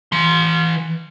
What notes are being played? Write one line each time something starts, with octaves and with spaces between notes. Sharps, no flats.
E3 C6